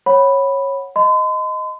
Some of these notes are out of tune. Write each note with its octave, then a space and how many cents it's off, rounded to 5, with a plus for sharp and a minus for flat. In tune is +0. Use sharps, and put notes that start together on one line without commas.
C#5 -15 F#5 +0 B5 +0
D#5 +0 C6 -45